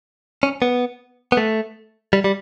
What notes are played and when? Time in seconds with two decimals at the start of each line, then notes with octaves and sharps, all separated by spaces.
0.43 C#4
0.62 B3
1.32 B3
1.37 A3
2.13 G3
2.24 G3